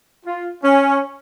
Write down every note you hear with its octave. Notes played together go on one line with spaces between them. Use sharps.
F4
C#4